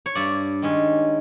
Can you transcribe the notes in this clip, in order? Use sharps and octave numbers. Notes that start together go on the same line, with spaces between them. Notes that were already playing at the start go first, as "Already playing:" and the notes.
C#5
G2 D5
D#3 G#3 C#4